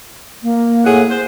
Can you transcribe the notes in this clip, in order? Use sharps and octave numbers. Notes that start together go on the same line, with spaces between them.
A#3
A2 G#4 F#5
C5